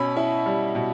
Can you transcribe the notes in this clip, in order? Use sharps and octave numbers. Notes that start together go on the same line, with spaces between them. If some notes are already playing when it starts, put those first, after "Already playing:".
Already playing: B2 C#4 B5 E6
E4
G3
B2